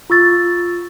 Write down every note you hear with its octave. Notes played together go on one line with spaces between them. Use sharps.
F4 C#6 E6 A6